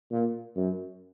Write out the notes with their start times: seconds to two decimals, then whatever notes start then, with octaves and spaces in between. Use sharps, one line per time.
0.11 A#2
0.56 F#2